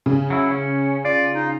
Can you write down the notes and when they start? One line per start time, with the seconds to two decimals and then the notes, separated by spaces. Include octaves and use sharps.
0.06 C#3
0.30 F#3 E4
0.51 C#4
1.05 F4 D5
1.35 D#4